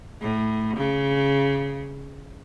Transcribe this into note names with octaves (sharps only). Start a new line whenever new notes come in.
A2
C#3